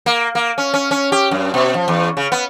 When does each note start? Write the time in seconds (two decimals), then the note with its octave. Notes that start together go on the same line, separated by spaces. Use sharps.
0.06 A#3
0.35 A#3
0.58 C#4
0.74 C#4
0.91 C#4
1.12 G4
1.31 F#2
1.54 B2
1.74 F3
1.88 E2
2.17 C#3
2.32 B3